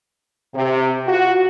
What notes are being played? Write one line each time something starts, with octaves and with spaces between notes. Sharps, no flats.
C3
F4 F#4